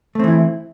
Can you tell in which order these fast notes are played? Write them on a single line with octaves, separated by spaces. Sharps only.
A3 C4 E3 E4